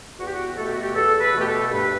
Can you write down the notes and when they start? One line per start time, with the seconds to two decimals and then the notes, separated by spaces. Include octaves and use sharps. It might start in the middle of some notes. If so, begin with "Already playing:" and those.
0.18 E2 F#4
0.25 G4
0.34 F#4
0.56 B2 A3 A4
0.65 G4
0.72 F#4
0.81 G4
0.94 E2 A4
1.20 B4
1.34 B2 A3 G4
1.46 A4
1.71 G2 B4